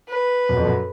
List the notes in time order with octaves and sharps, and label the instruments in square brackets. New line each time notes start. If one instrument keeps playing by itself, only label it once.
[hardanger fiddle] B4
[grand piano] F#2
F2
F#2